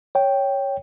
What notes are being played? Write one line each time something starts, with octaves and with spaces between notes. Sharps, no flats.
C#5 G5